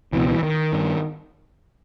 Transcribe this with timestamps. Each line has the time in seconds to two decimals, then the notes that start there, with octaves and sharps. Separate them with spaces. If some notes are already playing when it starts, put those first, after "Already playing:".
0.12 C#2 B2 E3
0.28 E3
0.43 D#3
0.73 G2